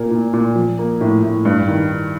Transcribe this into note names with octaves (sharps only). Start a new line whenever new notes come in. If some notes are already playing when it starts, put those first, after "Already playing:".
Already playing: A#2 A#3
A#2
A#2
F3
A#3
A2
A2
G2
D#3